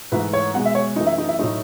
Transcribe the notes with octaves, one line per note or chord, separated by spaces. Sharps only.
G#2 E3 A3 B4
C#5
B2 G#3 F#5
E5
C#5
F#2 E3 A3 D#4
E4
D#4
E4
A2 F#3 A3 D#4